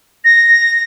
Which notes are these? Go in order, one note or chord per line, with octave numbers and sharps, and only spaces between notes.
A#6